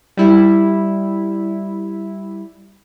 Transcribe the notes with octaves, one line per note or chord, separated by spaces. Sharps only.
G3 E4